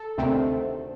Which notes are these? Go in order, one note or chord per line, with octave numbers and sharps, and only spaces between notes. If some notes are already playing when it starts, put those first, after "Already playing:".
Already playing: A4
D2 C3 D#3 A3 C4